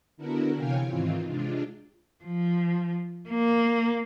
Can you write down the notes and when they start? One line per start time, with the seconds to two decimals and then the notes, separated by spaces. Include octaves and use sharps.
0.17 D3 B3 D4 E4 F#4 A#4
0.54 C3 E3 C#5 F5 G5 G#5
0.86 G#2 D#3 E3 C4 F4
1.27 C3 G#3 D4 F4
2.24 F3
3.28 A#3